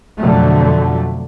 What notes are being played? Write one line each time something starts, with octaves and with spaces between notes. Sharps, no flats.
F2 B2 D3 F#3 A3